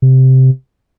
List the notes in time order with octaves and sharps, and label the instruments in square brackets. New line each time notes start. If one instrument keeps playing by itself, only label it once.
[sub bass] C3